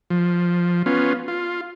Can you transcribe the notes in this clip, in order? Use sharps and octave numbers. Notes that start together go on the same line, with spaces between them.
F3
B3 C#4 F4
F4